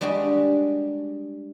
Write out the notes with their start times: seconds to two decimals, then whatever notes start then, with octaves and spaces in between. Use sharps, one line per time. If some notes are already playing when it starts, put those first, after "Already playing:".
0.01 G3 G#3 D4 F#4 G4